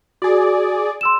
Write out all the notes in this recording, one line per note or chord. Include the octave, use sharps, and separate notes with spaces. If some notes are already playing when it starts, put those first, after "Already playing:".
F#4 G#4 D5
C6 E6 E7